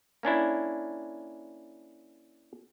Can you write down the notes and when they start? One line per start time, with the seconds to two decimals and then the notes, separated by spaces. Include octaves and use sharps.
0.23 A#3 C#4 D4 E4